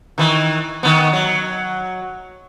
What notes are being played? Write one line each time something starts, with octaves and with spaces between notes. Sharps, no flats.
D#3 E3
D#3 B3
F#3